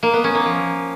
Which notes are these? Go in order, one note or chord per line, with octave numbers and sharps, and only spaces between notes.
A#3
B3
C#4
A#3
F3